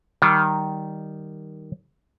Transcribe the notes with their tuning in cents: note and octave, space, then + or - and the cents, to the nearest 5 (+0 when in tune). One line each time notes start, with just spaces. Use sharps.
D#3 +0 G3 -15 G5 +0